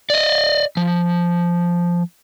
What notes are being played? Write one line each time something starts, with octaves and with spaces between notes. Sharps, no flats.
D5 D#5
F3